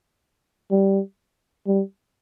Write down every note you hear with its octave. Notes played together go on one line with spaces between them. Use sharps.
G3
G3